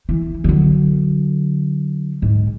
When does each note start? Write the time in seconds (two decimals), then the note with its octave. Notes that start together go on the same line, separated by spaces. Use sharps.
0.09 E3
0.44 D3 F#3
2.22 G#2